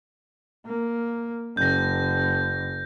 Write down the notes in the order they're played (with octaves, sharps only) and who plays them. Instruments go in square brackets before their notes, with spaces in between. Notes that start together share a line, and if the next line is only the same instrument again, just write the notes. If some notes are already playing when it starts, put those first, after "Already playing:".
[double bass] A#3
[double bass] F#1 [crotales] G6 A#6